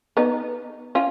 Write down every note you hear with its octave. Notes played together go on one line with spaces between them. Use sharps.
B3 D#4
C#4 F4